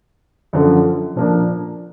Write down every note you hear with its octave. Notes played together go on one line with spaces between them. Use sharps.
F#2 D3 F3
A#2 F3 A#3 D4